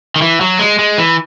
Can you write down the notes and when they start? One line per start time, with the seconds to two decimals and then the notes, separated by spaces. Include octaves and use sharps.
0.16 D#3
0.22 E3
0.41 F#3
0.59 G#3
0.79 G#3
0.98 E3